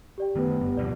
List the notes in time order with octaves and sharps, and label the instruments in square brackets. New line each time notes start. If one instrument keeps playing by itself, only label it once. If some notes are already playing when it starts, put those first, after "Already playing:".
[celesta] G4 D5 G5
[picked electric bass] D#3 A3 [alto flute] B3
[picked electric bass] G1 G2
[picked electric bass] D1 B2 F3 [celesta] D5